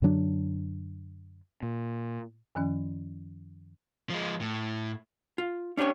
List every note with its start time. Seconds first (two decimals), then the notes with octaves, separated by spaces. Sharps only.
0.02 F#2 D3 F#3 D4
1.63 A#2
2.55 F#2 D#3 F3 C#4
4.10 F3 G#3
4.41 A2
5.38 F4
5.77 C#4 D4 G4 B4 C#5